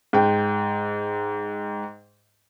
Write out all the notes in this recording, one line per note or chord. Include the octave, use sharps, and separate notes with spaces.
G#2 G5